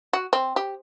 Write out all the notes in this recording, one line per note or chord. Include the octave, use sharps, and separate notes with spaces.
F#4
C4
G4